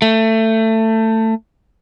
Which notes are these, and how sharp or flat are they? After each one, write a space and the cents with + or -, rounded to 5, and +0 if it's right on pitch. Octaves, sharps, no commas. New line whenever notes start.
A3 +20